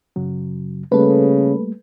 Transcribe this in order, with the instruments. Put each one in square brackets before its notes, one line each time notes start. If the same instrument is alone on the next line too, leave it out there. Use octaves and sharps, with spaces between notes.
[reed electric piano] F#2 C#3 F#3
[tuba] C#3 [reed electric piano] G3 A3 A#3 [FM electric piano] A4 B4